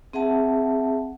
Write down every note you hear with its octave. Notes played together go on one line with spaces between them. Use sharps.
C4 G#4 E5 F#5 A5